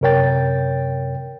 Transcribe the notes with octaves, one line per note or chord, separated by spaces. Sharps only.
F#2 C3 A#4 C#5 G5 A6